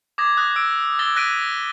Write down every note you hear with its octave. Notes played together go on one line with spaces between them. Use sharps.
D6 D#6 G#6 A#6
D#6 F#6 G#6 A#6
E6 D7
D6 E6 A6 A#6 G7
F#6 A#6 B6 D7 D#7